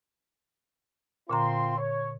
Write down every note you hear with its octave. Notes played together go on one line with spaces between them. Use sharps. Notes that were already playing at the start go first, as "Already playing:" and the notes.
A#2 D3 C4 F4 A#5 C6
C#5